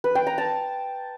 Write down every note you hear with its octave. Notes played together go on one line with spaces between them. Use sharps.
B4
G5
A#5
A5